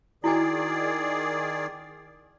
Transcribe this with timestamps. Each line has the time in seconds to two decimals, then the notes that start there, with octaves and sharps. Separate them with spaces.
0.24 D#3 E4 F#4 G#4 D5 G#5